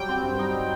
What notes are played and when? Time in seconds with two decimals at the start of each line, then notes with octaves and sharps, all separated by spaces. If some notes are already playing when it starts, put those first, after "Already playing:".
Already playing: F#3 G3 G5
0.09 C4
0.23 G2
0.39 D#4